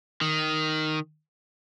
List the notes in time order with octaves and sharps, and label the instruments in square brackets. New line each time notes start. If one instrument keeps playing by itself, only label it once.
[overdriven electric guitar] D#3